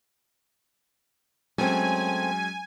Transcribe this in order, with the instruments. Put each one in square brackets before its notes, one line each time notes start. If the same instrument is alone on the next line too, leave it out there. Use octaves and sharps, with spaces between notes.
[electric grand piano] F#3 G#3 C#4 [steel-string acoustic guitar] A3 C4 [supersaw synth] G#5